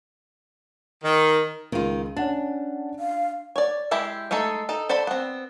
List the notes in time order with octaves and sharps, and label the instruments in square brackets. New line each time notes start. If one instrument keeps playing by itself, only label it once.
[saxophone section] D#3
[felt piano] C#2 [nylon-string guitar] D#3 F4
[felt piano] C#4 F#5 A5 [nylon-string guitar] D4
[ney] F5
[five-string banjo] C#5 D5
G#3 E4 G4 E5
G#3 A3 D#4 A4
D#4 A4
A4 C5 D5 A5 B5
B3 C4